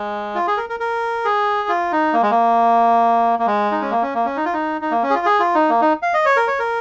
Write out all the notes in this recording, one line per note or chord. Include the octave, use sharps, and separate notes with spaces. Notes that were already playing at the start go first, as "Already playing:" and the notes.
Already playing: G#3
F4
G#4
A#4
A#4
A#4
G#4
F4
D#4
A#3
G#3
A#3
A#3
G#3
D#4
C#4
A#3
C#4
A#3
C#4
D#4
F4
D#4
D#4
A#3
C#4
G#4
F4
G#4
F4
D#4
A#3
D#4
F5
D#5
C#5
A#4
C#5
A#4